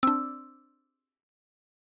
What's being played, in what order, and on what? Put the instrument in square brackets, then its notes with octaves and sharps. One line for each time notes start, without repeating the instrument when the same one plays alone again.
[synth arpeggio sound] C4 D4 [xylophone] E6